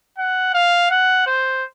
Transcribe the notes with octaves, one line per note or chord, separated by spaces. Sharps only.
F#5
F5
F#5
C5